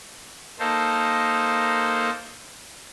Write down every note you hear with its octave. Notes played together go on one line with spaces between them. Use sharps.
A#3 D#4 A4 C5